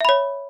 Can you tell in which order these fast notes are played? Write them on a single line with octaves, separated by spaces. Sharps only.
E5 B5 C#5